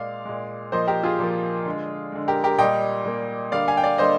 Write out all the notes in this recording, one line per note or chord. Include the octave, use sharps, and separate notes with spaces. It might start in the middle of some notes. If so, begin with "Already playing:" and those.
Already playing: A#2 G#3 D5 F5
A#2 G#3
A#2 F3 A#3 C5 D#5
G4 A#4
F4 G#4
A#2 F3 A#3
D3 G#3
D3 G#3
G4 A#4
G4 A#4
A#2 G3 A#3 D#5 G5
A#2 G3 A#3
D3 G3 A#3 D5 F5
F5 G#5
G5
D5 F5
D3 G3 A#3 C5 D#5